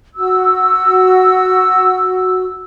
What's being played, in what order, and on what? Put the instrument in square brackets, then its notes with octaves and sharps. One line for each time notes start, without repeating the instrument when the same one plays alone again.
[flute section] F#4 E6